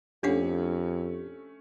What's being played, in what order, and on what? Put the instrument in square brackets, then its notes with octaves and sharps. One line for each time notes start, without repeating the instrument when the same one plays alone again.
[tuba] F2 [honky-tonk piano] A3 C#4 [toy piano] D4 F5 F#5 [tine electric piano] G4